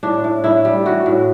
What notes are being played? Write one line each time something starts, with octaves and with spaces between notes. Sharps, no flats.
A2 D4
A2
A2 E4
G3
E3 F#4
A2